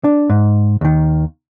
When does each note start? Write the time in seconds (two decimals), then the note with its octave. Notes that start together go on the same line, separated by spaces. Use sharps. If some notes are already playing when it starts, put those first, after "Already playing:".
0.04 D4
0.29 G#2
0.81 D#2 D#3